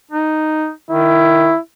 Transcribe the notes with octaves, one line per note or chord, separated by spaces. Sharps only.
D#4
D#3 E4